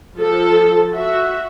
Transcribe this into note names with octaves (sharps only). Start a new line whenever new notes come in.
F3 A4
F#4 E5